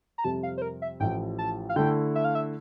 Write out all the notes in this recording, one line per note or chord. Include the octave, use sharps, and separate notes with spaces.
A#5
F2 C3 G3 A5
F5
C5
A#4
E5
A1 A2 F3 G5
A5
F5
D3 A3 E4 G5
E5
F5
E5